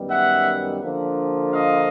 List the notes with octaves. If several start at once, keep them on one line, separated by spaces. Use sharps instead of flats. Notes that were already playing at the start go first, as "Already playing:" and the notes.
Already playing: F#2 D#3 G3 B3
E5 F#5
D3 F3 A#3
D#5 F5